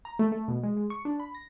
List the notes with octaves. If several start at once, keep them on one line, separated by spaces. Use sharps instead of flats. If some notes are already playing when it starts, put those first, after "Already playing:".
A#5
A3
A3
B2
G#3
G#3
C#6
D4
B5
A#6